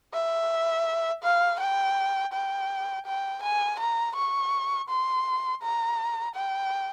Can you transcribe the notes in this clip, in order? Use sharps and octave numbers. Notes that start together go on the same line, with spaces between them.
E5
F5
G5
G5
G5
G#5
A#5
C#6
C6
A#5
G5